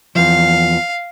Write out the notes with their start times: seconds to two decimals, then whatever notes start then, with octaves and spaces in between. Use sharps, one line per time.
0.15 E2 F3 F5